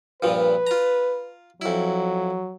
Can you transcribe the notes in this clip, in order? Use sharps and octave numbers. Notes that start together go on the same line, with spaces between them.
G2 A#2 F3 B4
F4 A#5
F2 F#3 E4